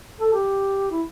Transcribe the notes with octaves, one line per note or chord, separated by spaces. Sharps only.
A4
G4
E4